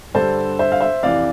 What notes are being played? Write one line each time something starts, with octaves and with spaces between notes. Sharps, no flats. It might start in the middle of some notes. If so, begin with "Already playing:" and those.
G2 D3 A4 C5
C5 E5
F5
C5 E5
F2 C3 E3 D5 F5